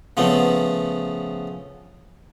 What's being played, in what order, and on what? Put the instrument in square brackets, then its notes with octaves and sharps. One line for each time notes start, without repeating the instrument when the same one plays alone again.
[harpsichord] C#3 F3 A3 B3